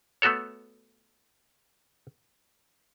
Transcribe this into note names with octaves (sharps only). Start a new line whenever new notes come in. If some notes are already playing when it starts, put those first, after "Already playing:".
A3 B3 F#4 A4 C#5